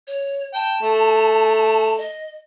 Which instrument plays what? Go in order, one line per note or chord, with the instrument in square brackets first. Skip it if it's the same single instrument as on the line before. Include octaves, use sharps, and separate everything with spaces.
[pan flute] C#5
[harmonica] G5 [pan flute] A5
[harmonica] A3
[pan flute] D#5